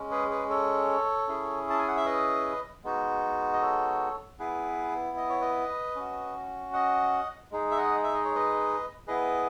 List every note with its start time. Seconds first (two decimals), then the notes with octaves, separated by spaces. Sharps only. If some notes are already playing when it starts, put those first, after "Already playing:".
Already playing: G#3 C#4
0.11 G#4 B4
0.30 G#4 B4
0.50 A4 C#5
1.28 C#4 E4 G#4
1.70 A5
1.79 G#5
1.88 F#5
1.97 E5
2.05 B4 D#5
2.84 G#3 B3 D#4 F#4
3.53 D#5
3.61 A4 C#5
4.39 B3 E4 G#4 B4
5.17 D#5
5.29 C#5
5.41 B4 D#5
5.95 C#4 F#4
6.73 D#5 F#5
7.51 G#3 D#4 G#4
7.71 E5
7.77 D#5 F#5
8.03 E5
8.14 D#5
8.25 C#5
8.35 B4 D#5
9.07 B3 E4 G#4 B4 D#5